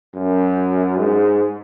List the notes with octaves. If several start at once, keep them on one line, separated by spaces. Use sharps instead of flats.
F#2
G#2